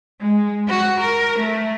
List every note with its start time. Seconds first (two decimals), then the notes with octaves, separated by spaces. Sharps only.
0.20 G#3
0.68 F#4
1.00 A#4
1.39 A3